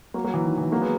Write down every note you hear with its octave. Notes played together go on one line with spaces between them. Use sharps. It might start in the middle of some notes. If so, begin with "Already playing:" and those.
F#3 A#3
F#3 A#3
E3
D#3
E3
F#3 A#3
G#3 B3